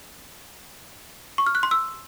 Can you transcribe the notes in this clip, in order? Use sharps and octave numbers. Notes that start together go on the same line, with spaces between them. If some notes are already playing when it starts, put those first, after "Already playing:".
C#6
F6
F#6
C6
E6